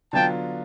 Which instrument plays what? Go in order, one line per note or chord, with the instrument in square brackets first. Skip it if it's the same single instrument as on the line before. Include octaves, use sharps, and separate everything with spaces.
[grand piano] D3 F#3 B3 D4 F4 [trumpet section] G5 A5